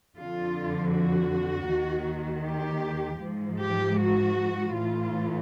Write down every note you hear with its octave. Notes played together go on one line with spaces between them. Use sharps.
F2 D3 F3 F4
F#4
D#2 D#3
G4
G#2 F3
G4
F#4
A2 E3 F4